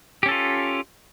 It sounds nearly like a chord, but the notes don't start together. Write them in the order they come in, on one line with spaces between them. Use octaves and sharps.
G4 C#4 A4 F4